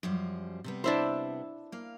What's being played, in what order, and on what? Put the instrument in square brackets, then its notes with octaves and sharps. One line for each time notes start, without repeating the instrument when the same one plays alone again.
[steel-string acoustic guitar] F#2 F3 G3
C3 G3 B3
[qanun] D4 E4 C5
[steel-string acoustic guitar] A#3 F5